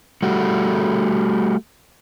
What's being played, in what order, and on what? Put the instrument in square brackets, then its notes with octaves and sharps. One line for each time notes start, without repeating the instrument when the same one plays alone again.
[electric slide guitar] G3 A3 F#4